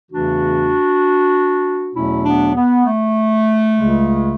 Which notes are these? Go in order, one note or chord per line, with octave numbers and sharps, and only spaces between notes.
E2 C#3 E3 A3 D4 F#4
E2 B2 F#3 A3 C#4 E4
B3 D4
B3
A3
C#2 C#3 G#3